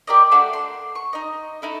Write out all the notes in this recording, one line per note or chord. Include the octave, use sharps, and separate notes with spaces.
G4 A#4 D5 D#5
A3 D4 F#4
C6
C#6
D#4 D#5
D#4 E4 A4